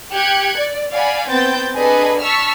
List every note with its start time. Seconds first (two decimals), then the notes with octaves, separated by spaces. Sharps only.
0.15 G4 F#6 G#6 C#7
0.58 D5
0.92 D5 F5 F#5 G#5 B5
1.30 B3 C4 G5 G6 A6
1.74 D4 G#4 A4 B4 D#5 G#5
2.21 A5 C#6 E6 F6 B6